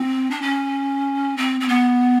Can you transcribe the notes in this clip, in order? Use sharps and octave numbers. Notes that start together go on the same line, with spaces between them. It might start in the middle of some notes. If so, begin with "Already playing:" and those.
Already playing: C4
D4
C#4
C4
C4
B3